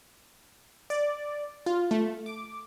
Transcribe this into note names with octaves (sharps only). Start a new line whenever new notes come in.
D5
F4
A3
D6